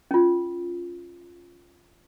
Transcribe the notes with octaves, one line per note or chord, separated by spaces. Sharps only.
C#4 F4